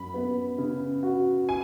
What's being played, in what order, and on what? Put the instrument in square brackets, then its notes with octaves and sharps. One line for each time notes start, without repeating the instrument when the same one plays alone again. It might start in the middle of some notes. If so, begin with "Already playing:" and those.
Already playing: [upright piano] F#2 [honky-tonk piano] B5
[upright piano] B3
C#3
F#4
[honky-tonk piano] G#5